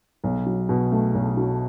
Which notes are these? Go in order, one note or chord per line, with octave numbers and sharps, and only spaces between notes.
B1
F#3
B2
A3
B1
F#3